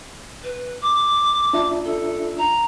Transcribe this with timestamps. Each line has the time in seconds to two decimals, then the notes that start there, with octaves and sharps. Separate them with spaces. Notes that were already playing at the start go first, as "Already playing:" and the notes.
0.43 B4
0.82 D6
1.53 D4 F4 E5
1.84 A4
2.38 A#5